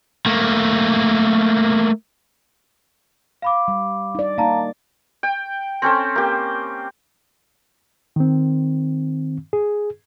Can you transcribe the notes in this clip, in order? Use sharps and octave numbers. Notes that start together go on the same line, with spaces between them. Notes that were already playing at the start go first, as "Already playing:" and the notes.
A3 A#3
F5 B5 D6
G3
D#4 D5
A#3 D#4 F5 A5 A#5
G5
C4 C#4 A4 C5
A#3 G4
D#3 C4
G#4